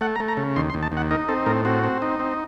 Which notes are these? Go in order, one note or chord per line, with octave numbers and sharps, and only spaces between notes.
A3 F#5
A#5
A3
A#5
C#3
D#2 C6
C6
D#2
A5
D#2
F#5
D#4 A#4
C4 A4
A2 A#4
C4 F#4
C4
D#4
C4